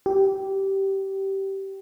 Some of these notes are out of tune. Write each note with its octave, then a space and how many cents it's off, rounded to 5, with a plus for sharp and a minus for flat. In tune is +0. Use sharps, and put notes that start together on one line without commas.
G4 -15